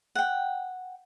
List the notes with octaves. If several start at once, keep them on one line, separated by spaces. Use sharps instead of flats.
F#5 G5